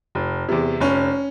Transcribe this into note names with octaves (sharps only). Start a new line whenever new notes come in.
F1
E2 C3
F1 C#4